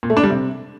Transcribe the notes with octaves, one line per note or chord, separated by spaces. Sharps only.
A#2
A3
D4
G3
C3